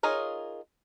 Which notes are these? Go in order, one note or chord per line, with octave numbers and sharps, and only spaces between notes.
D#4 F4 G#4 A#4 C#5